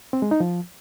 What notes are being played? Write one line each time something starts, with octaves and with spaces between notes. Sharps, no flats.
C4
G#3
D#4
F3